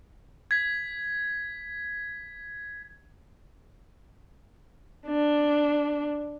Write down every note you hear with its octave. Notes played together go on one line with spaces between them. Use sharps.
G#6 B6
D4